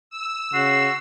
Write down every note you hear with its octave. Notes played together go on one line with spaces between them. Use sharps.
E6
C#3 F#4 C7